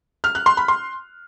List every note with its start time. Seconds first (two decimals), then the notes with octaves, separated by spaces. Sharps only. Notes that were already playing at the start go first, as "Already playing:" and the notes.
0.24 F6
0.35 F#6
0.46 C6
0.57 B5
0.68 C6